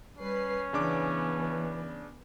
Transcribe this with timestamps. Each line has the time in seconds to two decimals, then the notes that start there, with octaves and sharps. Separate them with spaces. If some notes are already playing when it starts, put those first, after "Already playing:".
0.17 G3 C#4 B4 C7
0.73 C#3 E3 B3 D4 D6